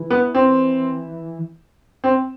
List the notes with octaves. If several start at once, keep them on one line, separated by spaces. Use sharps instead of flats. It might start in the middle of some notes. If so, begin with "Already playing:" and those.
Already playing: E3
B3
C4
C4